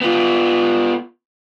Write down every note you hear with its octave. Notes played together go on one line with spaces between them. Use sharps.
B3 F4